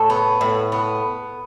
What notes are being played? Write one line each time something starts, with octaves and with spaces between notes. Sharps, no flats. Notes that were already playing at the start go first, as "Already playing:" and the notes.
Already playing: A2 A4
B3
A2
B3